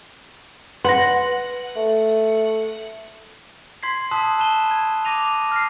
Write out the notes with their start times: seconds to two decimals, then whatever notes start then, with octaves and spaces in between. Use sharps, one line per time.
0.84 B4 F#5 C6 A#6
1.76 A3
3.83 C6 G#6 B6 C7
4.11 A5 C6 D#6 E6 F#6 B6
4.38 A5 B5 F#6 D#7 E7 G7
4.71 G#6
5.05 D6 A#6 D#7 F7
5.51 F6 A#6 C7